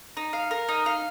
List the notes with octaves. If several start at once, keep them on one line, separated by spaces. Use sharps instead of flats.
D#4
F5
A#4
D#4
F5